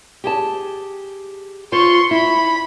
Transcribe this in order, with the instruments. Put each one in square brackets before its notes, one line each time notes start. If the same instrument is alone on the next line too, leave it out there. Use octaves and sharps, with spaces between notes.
[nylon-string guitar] G4 G#4 A5
[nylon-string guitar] F4 C5 [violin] C6 C#6
[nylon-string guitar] E4 [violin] B5